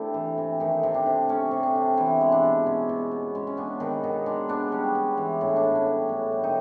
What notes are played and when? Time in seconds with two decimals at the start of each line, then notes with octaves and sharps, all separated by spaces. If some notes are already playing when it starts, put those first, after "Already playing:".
Already playing: C3 A3 D4 E4
0.14 E3
0.38 C3
0.60 D#3 A3 D#4
0.83 C3
0.94 D4
1.06 C3
1.29 A3 C#4
1.51 C3
1.63 D4
1.75 C3
1.97 E3 B3 E4
2.21 G#3
2.32 D4
2.43 B2
2.66 B2 C#4
2.89 B2
3.11 B2
3.35 G#3 C#4
3.47 C#4
3.57 B3 D4
3.80 D#3 B3 D#4
4.03 B2 D#3 D#4
4.26 G#3 D4
4.49 B3 D4
4.72 G3 C#4
4.95 B3
5.17 E3
5.41 A2 D4
5.49 D#4
5.56 D4
5.63 B3
5.75 C#4
5.86 G3
6.09 A2 D4
6.32 G3
6.44 D#3 D#4